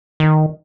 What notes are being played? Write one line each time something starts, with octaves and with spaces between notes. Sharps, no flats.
D#3